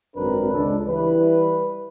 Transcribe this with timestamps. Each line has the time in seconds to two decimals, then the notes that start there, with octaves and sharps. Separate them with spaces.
0.16 G#1 F#2 C4 D4 A#4 B4
0.53 C#2 D4 A4
0.87 E3 G3 E4 B4